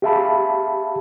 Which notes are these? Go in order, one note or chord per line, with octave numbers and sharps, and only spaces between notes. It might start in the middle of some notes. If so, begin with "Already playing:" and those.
G4 G#4 E5 F5 A5 B5